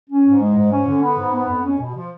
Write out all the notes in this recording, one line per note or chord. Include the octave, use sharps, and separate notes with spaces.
C#4
G#2
G#3
G#2
C#4
D3
B3
G#2
B3
F2
C#4
B2
F3